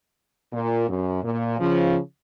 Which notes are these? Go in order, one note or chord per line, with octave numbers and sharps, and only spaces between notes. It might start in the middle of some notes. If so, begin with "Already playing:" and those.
A#2
F#2
A#2
C#3 F3